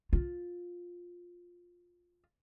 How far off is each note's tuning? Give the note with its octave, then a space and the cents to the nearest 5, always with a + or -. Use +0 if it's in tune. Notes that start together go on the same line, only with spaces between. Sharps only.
F4 +10